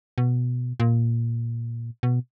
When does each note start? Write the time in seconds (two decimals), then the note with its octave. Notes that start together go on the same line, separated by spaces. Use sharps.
0.18 B2
0.80 A#2
2.03 B2